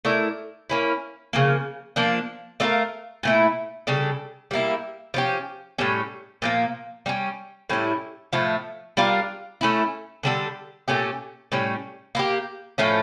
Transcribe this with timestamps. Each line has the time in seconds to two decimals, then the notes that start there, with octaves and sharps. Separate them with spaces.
0.05 A3 E4 A#4 D5
0.70 A#3 C#4 E4
1.33 C#3 F3 A#3
1.96 F3 A#3 D4
2.60 A3 D4 F4 A#4
3.23 A#2 A3 E4
3.87 C#3 G3 D4 A4
4.51 G3 A#3 E4
5.14 F3 C#4 G4
5.78 A2 G3 C#4
6.42 A#2 F3 A#3
7.06 G3 A#3 C#4
7.69 A2 G3 C#4 E4
8.32 A2 F3 A3
8.97 G3 D4 F4 A#4
9.61 A3 C#4 E4
10.23 D3 G3 D4 A4
10.88 A#2 A3 C#4 G4
11.52 A2 G3 C#4
12.15 A#3 E4
12.19 G4
12.78 A2 F3 A3 C#4